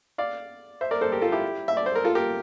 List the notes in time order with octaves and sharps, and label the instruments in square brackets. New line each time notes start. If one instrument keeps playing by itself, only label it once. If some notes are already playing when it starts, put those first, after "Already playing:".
[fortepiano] D5 F5
C5 E5
A#4 D5
A4 C5
G4 A#4
F4 A4
E4 G4
E5
D5
C5
A#4
F4 A4
G4 A#4